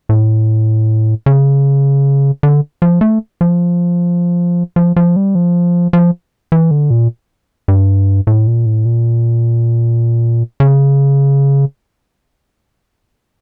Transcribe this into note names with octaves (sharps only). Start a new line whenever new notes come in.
A2
C#3
D3
F3
A3
F3
F3
F3
G3
F3
F3
E3
D3
A#2
G2
A2
A#2
A2
A#2
C#3